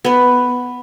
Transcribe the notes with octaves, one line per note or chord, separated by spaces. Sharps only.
B3 B4